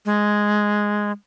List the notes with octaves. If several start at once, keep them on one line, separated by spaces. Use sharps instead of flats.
G#3